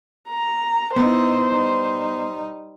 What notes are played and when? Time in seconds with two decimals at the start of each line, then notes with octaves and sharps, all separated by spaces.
0.29 A#5
0.96 B3 D#4 E4 C5
1.52 G3 D#4